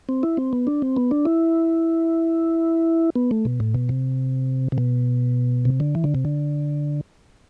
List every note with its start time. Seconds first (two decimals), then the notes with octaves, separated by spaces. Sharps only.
0.09 C4
0.23 E4
0.37 C4
0.53 B3
0.67 D4
0.82 C4
0.96 B3
1.11 D4
1.25 E4
3.16 B3
3.31 A3
3.45 B2
3.60 A2
3.75 B2
3.89 C3
4.72 C3
4.78 B2
5.65 C3
5.80 D3
5.95 E3
6.04 D3
6.15 C3
6.25 D3